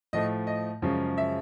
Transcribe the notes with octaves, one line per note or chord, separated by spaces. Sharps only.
A2 F3 A3 D#5
D#5
F#2 C#3 F3 G#3 C#4
E5